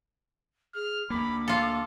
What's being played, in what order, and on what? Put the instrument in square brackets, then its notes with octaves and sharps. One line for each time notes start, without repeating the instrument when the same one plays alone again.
[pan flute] G#4 [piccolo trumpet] F6
[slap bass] D2 A#3 [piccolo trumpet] B5 [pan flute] D6
[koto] F4 A4 [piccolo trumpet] F5